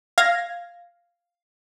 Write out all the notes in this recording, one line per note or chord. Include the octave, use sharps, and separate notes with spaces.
F5 G#6 A#6